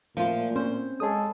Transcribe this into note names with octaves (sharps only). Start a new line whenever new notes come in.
A#2 F3 A3 F4
C4 C#4 C5
G#3 G#4 A4 C#5 D#6